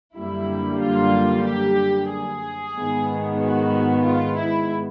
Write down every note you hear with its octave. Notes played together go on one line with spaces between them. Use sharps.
F#2 D3 G3 A#3 E4
F4
G4
G#4
G#2 D#3 G#3 B3
F#4
F4
E4